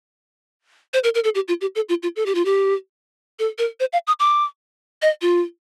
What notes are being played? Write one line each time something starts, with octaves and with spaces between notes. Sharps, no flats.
C5
A#4
A#4
A4
G4
F4
G4
A4
F4
F4
A4
G4
F4
G4
A4
A#4
C5
F5
D#6
D6
D#5
F4